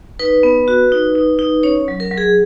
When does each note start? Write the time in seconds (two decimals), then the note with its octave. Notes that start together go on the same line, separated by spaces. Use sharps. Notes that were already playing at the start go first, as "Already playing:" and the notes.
0.19 D#4 B4
0.43 B3
0.68 F#4
0.92 D#4
1.16 D#4
1.39 D#4
1.63 C#4 C#5
1.88 F#3
2.00 A#4
2.11 F#3
2.18 G#4